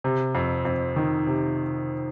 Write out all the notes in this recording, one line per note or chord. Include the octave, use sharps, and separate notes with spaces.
C3
F2
F2
D#3
C3